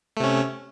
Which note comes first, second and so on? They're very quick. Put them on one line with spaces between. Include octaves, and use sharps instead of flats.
A3 C3 C#4